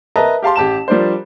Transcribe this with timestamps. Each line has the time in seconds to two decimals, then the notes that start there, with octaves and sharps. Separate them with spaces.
0.16 A#4 B4 D#5 E5 A5 A#5
0.43 G4 F5 A5 C6
0.56 A1 G4 A5 E7
0.88 F3 G3 D4 A#4 C5